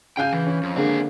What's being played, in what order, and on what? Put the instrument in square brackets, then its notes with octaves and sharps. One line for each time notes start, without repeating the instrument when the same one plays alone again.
[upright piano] C#3 F5 G6 [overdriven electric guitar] G5 G#5
[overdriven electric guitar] E3
[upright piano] C#4
[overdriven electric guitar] F2
[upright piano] D3 G#3 A#3 [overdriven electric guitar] C4 G#4